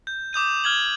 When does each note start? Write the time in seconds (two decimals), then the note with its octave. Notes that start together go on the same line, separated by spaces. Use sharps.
0.07 G6
0.33 D6 D#6 G6 D#7
0.64 F6 G#6 F#7